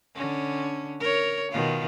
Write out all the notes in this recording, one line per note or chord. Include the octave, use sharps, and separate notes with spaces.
D3 C#4
A#4 C#5
B2 D#3 F4